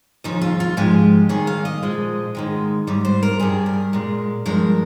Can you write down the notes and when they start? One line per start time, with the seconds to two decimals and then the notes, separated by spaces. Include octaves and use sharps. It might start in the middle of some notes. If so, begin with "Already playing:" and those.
0.24 D#2 C#3 F3 D#4
0.42 F4
0.60 F4
0.77 G#2 F3 G#3 G4
1.29 D#2 D#3 G3 G#4
1.47 F5
1.65 D#5
1.83 A#2 F3 G#3
2.35 G#2 D#3 G#3
2.87 G#2 G3
3.05 C5
3.23 A#4
3.40 G2 G3 G#4
3.66 A#4
3.93 A#2 G#3
4.46 G2 F3 G#3 A#4